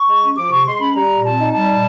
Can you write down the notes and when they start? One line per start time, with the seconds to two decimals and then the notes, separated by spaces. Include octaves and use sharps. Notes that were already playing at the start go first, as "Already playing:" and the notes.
Already playing: C#6
0.09 G#3
0.22 C#4
0.37 F3 D6
0.51 C3 C#6
0.67 G#3 C6
0.80 C#4 B5
0.95 G3 A#5
1.10 A#2
1.24 C4 A5
1.39 D#4
1.53 G3 A5
1.68 A#2